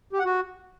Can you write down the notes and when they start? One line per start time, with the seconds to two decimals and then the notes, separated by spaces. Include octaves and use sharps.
0.13 G4
0.19 F#5
0.25 F#4